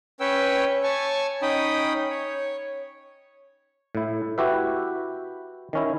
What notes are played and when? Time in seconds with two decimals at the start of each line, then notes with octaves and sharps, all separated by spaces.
0.20 C#4 B4 C#5 G5 E6
0.83 C#5 G#5 A5 C#6
1.42 C#4 D#4 G5 B5 D#6
2.10 C#5
3.95 A2 E4
4.38 E4 F#4 G4 B4 E5
5.73 D#3 C#4 E4